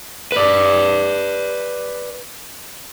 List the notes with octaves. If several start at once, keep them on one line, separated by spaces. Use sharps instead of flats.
B4 D5